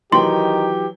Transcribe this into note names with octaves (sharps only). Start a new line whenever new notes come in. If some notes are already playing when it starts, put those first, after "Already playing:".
D#3 E3 F#3 G4 G5 C6